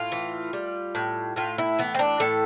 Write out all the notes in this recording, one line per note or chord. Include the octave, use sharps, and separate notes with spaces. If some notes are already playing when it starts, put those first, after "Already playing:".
Already playing: A2 F4
E3
G3
A2
A2 F4
E4
E3 B3
C4
D4
A2 A4